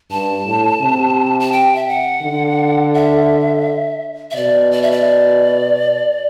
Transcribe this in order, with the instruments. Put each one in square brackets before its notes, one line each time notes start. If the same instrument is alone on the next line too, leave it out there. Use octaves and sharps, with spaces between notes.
[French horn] G2 [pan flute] A5
[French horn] A2
C3
[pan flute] A5
G5
E5
F#5
[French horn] D3
[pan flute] E5
E5
[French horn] B2 [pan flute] D5
[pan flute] D5
E5
D5